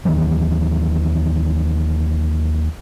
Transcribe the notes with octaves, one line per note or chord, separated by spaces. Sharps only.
D#2 D#3 E3 F#3